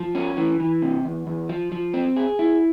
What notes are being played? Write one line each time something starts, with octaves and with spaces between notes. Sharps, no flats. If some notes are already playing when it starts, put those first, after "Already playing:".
Already playing: F3
C#4
E3
E3
C3
E2
E2
F3
F3
C4
G#4
E4